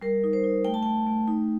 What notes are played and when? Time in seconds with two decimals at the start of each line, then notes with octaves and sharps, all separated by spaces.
0.02 G3 A#4
0.24 D#4
0.33 C5
0.44 D#4
0.65 A3 G5
0.74 A5
0.83 A3 G5
1.07 A3
1.28 D#4